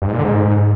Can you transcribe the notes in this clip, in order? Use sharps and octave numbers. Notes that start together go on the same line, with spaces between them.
G2
G#2
A#2
D3
G#2